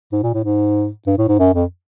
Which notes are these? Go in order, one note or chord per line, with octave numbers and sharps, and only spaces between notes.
G#2
A#2
A2
G#2
G2
A2
G#2
F#2
F2